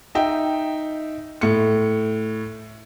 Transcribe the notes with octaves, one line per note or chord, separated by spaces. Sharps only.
D#4 E5 G5
A2 C#7